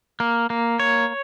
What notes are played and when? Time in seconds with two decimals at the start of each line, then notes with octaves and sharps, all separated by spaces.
0.20 A#3
0.50 A#3
0.80 C#5